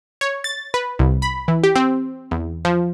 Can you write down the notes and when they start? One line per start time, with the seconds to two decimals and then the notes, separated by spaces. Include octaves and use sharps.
0.21 C#5
0.44 A6
0.74 B4
0.99 C2
1.22 B5
1.48 E3
1.64 G4
1.76 C4
2.31 E2
2.65 F3